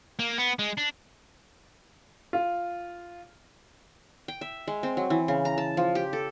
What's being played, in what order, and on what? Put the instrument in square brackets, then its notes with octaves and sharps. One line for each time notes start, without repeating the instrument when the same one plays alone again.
[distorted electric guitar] A#3
B3
G#3
D4
[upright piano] F4
[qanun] G5
E5
G#3
C4
F#3
E3
C#3
A#5
A5
F3
G4
A4